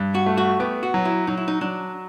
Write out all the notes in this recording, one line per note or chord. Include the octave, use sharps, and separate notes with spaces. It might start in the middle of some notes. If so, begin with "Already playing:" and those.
Already playing: G2
F#4
A3
F#4
B3 G4
F#4
F#3
E4
F#3 D#4
E4
D#4
F#3 D4